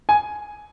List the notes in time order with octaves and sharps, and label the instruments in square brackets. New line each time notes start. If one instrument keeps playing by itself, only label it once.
[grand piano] G#5